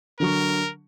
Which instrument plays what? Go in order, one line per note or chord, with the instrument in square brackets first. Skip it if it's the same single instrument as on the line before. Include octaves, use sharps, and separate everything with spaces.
[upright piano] D3 F#3 C#6 [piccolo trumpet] A#4